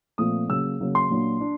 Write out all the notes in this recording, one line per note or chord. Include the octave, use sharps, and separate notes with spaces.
A#2 F3 A3 C4 D#6
C#3 F#3 A#3 C#4 E6
C#3 F#3 A#3 C#4
C6
A#2 F#3 A#3 D4
D4